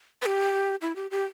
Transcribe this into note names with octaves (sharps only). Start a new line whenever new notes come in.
B4
G4
E4
G4
G4